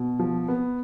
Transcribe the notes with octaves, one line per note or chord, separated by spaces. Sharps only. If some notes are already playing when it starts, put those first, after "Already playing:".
Already playing: B2
F3
B3